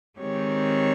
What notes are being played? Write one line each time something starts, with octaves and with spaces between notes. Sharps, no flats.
D#3 G#3 C4 G4 C#5